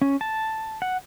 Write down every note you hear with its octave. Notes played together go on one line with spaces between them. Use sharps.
C#4
A5
F#5